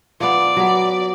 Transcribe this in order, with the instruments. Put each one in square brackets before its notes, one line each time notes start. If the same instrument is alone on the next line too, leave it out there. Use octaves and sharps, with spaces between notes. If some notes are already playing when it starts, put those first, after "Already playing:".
[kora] F3 B3 [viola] D5
[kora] F#3 B3